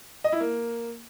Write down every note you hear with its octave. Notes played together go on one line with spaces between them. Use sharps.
D#5
E4
A#3